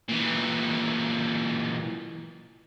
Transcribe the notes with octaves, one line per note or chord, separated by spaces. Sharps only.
A#2 E3